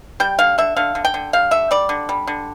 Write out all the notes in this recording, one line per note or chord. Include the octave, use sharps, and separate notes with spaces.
G3 G5
D3 F5
D3 E5
D3 F5
D3
G5
D3
G3 F5
D3 E5
G3 D5
D3
G3
D3